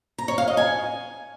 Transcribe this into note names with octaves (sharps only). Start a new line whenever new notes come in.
A#5
C#5
F5
D#5
G#5